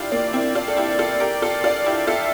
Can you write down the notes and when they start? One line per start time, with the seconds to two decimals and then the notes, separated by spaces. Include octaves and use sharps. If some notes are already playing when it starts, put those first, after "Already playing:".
Already playing: D4 E4 F4 G4
0.11 A#3 D4 D5
0.33 C4 E4
0.55 D4 F4
0.68 A4
0.77 E4 G4
0.99 F4 A4
1.20 G4 A#4
1.42 F4 A4
1.64 D4 F4
1.86 E4 G4
2.07 F4 A4 E5